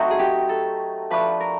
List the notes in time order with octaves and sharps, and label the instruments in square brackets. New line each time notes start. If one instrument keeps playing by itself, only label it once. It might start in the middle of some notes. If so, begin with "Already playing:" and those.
Already playing: [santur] F#3 A3 C4 D#4 [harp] F#4
[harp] G#4
G4
A4
[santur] F3 A3 D4 [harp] B4
[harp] A#4